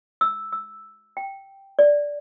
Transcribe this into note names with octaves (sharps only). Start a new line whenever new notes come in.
E6
E6
G5
D5